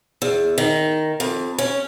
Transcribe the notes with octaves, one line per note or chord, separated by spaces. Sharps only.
E2
D#3
F2
C#4